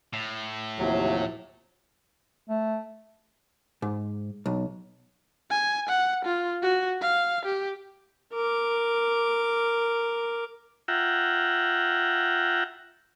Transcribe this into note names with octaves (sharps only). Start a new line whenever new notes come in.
A2
D#2 C3 F3 F#3 E4
A3
G#2
B1
G#5
F#5
F4
F#4
F5
G4
A#4 D6
F4 E5 F#5 G5 A#5